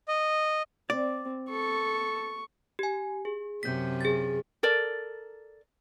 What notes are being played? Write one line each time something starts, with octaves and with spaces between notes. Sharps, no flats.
D#5
C4 D5
A4 C#6
G4 G#5
G#4
F#2 C3 C#4 G6 B6
G#4 A6
A4 A#4 D5